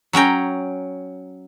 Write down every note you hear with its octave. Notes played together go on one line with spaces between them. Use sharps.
F#3 C#4 G5 A#5